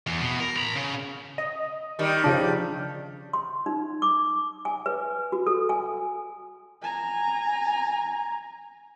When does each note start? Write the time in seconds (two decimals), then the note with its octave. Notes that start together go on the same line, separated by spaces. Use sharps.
0.07 E2
0.20 B2
0.40 A#4
0.57 A#5 B5
0.75 C#3
1.38 D#5
1.99 D#3 G3
2.24 C#3 F3 D4
3.33 C6
3.66 D#4
4.02 D6
4.65 G#5
4.86 B4
5.32 F#4
5.47 A4
5.69 G#5
6.82 G#5 A#5